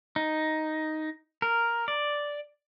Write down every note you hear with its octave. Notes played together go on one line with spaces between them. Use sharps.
D#4
A#4
D5